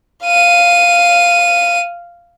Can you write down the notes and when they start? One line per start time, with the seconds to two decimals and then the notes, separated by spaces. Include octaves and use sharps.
0.24 F5 D#7